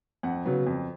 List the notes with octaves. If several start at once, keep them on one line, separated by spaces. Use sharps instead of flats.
F2 F#5
C#3 F#3 B3
F2